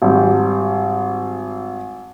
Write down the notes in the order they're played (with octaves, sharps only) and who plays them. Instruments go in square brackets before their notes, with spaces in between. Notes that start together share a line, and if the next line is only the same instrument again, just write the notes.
[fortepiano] G#1 G3